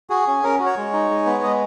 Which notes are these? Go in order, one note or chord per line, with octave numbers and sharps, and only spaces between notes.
F#4 G#4
C#4
C#4 A#4
F#4
C#5
G#3
D#4
G#3
B3
G#3 D#5